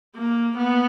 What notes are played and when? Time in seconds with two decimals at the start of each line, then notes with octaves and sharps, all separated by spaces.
0.15 A#3
0.58 B3